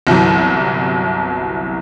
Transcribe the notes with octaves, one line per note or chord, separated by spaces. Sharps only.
G1 C2 E3 F#3